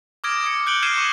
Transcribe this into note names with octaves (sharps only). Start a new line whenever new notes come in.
D6 D#6 F6 G#6 A#6 D7
G#6 C#7
F#6 G6 C#7 D7 F#7 G7
F6 G#6 C7 D#7 E7
C#6